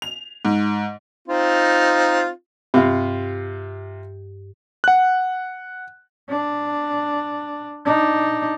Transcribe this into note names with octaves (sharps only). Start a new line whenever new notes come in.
F7
G#2
C4 D#4 F4
G2 C3 F4
F#5 F#6
D4
D4 D#4